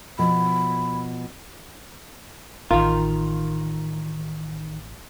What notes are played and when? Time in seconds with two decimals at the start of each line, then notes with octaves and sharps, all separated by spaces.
0.19 B2 F3 B5
2.71 A1 D#3 F4 A#4